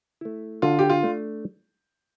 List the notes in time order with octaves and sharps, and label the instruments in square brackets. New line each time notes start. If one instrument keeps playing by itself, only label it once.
[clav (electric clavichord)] A3 E4
[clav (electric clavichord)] D3 [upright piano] F4
[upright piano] G4
F4
[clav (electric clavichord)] A3 D4